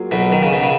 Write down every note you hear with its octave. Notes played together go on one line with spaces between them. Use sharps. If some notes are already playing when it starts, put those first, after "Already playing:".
Already playing: F#3 A#3 F4 G#4
B1 B2
D#3
C#3
B2
C#3